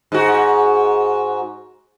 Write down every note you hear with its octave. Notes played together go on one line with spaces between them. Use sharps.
G#2 F#4